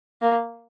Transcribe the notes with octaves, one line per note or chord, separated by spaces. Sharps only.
A#3